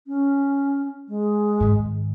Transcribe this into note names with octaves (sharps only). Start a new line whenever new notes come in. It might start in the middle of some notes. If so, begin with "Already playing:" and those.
C#4
G#3
G#2 D#3